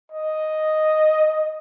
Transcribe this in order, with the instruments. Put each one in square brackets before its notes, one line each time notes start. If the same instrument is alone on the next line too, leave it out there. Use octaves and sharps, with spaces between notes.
[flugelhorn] D#5